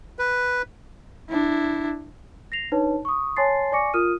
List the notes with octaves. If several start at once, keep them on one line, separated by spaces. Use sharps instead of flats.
B4
D4 E4
A#6 C7 F7
D4 D#4 B4 C#5 A5
C#6 D#6
C#5 G#5 A5 C6 A6 C7
D5 G#5 C#6 D6 A#6 C#7
F4 A#4 D#6 F6 D#7